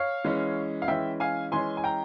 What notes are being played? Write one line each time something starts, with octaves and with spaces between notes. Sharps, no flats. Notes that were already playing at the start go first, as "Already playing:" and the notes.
Already playing: C#5 F5
E3 G#3 C#4
F5
E3 G#3 C#4 E5 G5
F5 G#5
E3 G#3 C#4 G#5 C6
G#5
G5 A#5